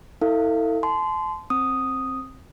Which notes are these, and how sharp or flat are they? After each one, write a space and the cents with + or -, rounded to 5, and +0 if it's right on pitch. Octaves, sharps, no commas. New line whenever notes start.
E4 -35 A4 +30 F5 -25
A5 -30 C6 -20
C4 +15 D#6 +0